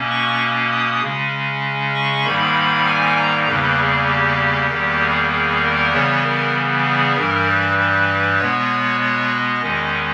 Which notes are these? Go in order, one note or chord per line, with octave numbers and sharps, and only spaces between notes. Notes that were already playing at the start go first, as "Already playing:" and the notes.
Already playing: B2 A#3 C#4
C#6
D#6
C#3 G#3 C#4
C#6
G#2 D#3 G3 A#3 B5
G#5
A#5
E2 C#3 G3 A#3 B4
G#4
G4
E2 D#3 G3 A#3
G#4
G#4
A#4
C#3 E3 G3 B3 C#5
A#4
G#4
G2 E3 G3 A#4
B4
B4
B2 G#3 B3 C#5
C#5
D#5
E2 D#3 G#3 C#4